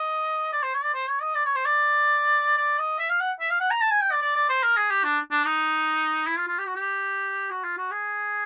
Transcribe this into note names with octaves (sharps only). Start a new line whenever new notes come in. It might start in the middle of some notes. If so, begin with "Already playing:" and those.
Already playing: D#5
D5
C5
C#5
D5
C5
C#5
D#5
D5
C#5
C5
D5
D5
D#5
E5
F5
F#5
E5
F5
F#5
A#5
A5
G#5
G5
D5
D5
D5
C5
A#4
G#4
G4
D4
D4
D#4
E4
F4
F4
G4
F#4
G4
F#4
F4
F#4
G#4